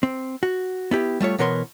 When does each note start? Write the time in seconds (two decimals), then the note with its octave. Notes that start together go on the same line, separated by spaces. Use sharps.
0.03 C4
0.43 F#4
0.91 B3 E4 G4
1.20 G3 A3 F4 C#5
1.38 B2 E3 B3 A#4 C#5 C6